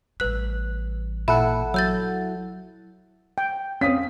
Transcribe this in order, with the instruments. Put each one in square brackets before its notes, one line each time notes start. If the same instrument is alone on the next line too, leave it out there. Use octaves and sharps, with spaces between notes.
[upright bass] A1 G3 [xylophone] B4 F#6
[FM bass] A#2 [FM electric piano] E4 A4 F#5 [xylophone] B5
[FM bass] F#3 [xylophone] E6 G6 A6
[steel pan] G5
[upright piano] C4 B6 [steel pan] C#4 F5 D#6